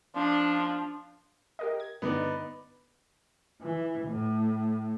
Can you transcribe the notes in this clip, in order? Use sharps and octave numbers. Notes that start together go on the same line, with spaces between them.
F3 D4
G4 A#4 D#5
G#6
G2 D3 B3 D#4 D5
E3
A2